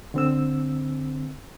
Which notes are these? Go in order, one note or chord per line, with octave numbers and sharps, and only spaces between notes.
D3 C4 E6